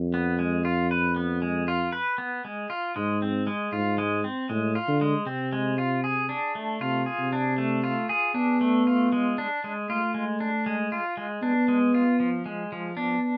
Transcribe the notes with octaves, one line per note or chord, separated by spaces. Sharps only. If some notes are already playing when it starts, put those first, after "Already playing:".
Already playing: F2
B3
G#3
F4
B4
B3
G#3
F4
B4
B3
G#3
F4
G#2 G#3
C4
G#3
G#2 F4
G#3
C4
A2 G#3
F4
D3
G#3
C3 C4
G#3
F4
G#4
D4
A3
C3 F4
G#4
C3
D4
A3
F4
G#4
B3 D4
A3
F4
G#3
D4
G#3
A3 F4
G#3
D4
G#3
F4
G#3
B3 D4
G#3
F4
F3
G#3
F3
B3 D4